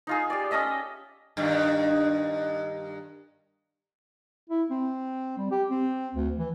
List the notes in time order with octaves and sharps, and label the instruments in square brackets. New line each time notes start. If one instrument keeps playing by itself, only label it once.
[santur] D#4 F4 G#4
G4 D5
C#4 A4 D#5 E5
[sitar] G2 D#3
[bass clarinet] E4
C4
G3
G4
C4
D2
E3